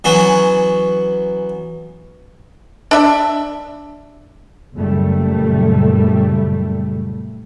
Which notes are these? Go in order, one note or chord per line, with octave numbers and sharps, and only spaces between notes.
E3 F#3 B3 C#4
D4 E5
F#1 A#2 G3 A3